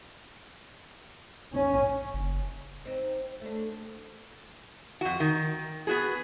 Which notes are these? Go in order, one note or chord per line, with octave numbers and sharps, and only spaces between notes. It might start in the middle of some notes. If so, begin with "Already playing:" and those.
C#4
F#1
C4 D#4
A3 D4
F2 F#4
D#3
B3 F#4 G#4